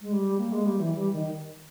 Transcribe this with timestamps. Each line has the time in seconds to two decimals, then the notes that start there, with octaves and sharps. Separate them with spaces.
0.01 G#3
0.12 G3
0.38 A#3
0.52 G#3
0.65 G3
0.80 E3
0.96 G3
1.13 D#3